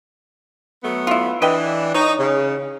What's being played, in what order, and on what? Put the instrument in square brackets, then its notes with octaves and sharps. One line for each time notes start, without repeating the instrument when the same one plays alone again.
[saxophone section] F#3 A3 B3
[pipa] E4 F4
[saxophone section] E3 D4 [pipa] B4 D#5 G5
[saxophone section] D#4 [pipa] C#5
[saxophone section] C#3